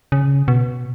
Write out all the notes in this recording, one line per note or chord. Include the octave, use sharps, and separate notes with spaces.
C#3
B2